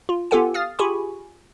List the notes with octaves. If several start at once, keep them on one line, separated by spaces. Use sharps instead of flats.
F4
B3 F4 G4 A4 F#5 G#5
F5 D#6 F6 A6
F4 G4 G#4 G#5 B5 C#6